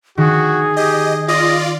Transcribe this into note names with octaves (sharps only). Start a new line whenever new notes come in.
D#3 F#4 G#4
G4 D#5
F4 D5 D#5